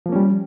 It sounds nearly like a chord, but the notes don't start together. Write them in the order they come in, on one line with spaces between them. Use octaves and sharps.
F3 A#3 C#4 G3